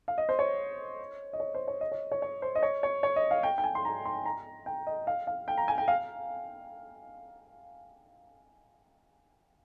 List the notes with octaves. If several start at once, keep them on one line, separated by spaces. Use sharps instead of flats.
F5
D#5
C5
C#5
D#5
C#5
C5
C#5
D#5
C#5
C#5
C#5
C5
D#5
C#5
C#5
C#5
D#5
F5
G5
G5
G#5
C6
A#5
C6
A#5
G5
D#5
F5
F5
G5
A#5
G#5
G5
F5